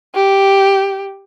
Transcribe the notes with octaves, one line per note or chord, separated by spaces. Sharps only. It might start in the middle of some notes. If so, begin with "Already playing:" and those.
G4